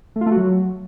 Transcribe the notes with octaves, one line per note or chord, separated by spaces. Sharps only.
A3
F4
A3
F#4
F#3